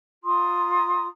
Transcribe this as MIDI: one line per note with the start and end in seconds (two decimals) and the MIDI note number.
0.24 1.07 65
0.24 1.07 82
0.24 1.07 84
0.24 1.07 87